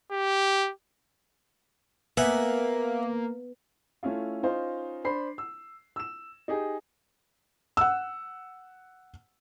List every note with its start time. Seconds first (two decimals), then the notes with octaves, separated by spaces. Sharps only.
0.11 G4
2.17 A#3 B3 E5 F#5 G#5
4.03 A3 C#4 E4 F4
4.43 C#4 D#4 F4 C5
5.04 D4 C5 B5 C7
5.38 E6
5.96 E6 E7
6.48 D#4 G4 G#4
7.77 F#5 E6